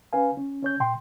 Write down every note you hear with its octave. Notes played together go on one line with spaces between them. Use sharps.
C#4 B4 F5 G#5
C#4
C#4 C#5 G6
A#2 G5 C6